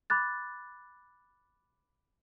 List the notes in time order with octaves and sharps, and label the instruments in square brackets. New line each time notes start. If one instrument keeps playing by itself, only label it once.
[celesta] B5 D6 F#6 A6